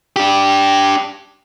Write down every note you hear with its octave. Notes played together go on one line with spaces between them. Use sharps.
D4 G4